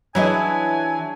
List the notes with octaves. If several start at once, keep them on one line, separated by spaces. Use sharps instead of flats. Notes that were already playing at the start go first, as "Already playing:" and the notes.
E3 F#3 D4 E4 G#4 D#5 E5 G#5